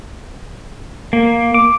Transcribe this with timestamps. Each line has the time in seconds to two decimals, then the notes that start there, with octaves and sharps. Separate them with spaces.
1.13 A#3
1.54 D6